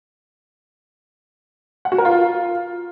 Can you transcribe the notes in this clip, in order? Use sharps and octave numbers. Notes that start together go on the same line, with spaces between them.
F#5
F#4
A#4
F4